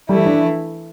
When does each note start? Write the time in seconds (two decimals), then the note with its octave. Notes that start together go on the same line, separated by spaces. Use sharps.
0.09 E3 G3 A3 E4
0.26 D4